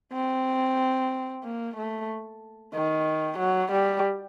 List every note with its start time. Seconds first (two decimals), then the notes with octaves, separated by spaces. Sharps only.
0.12 C4
1.44 A#3
1.76 A3
2.74 D#3
3.38 F#3
3.71 G3